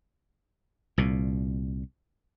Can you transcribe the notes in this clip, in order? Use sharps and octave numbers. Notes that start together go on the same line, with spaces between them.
C2 A#2